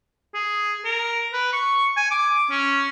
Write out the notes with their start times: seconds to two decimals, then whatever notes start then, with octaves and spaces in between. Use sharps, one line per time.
0.34 G#4
0.85 A#4
1.33 B4
1.53 C#6
1.97 G#5
2.11 D6
2.50 C#4